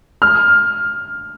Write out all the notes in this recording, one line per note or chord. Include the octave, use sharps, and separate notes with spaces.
F6